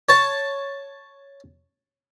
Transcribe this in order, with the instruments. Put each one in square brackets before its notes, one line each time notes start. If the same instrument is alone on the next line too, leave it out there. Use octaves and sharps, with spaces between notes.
[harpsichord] C#5 A5